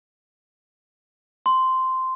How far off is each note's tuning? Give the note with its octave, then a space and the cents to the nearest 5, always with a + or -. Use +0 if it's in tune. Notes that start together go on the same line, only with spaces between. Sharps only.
C6 -10